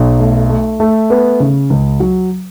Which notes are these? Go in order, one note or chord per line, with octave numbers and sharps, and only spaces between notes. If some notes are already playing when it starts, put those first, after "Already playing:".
Already playing: B1
A3
A3
A3
B3
C#3
C#2
F#3